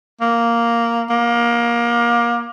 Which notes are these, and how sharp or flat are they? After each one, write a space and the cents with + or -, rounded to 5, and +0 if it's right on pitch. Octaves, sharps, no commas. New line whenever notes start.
A#3 +0
A#3 +25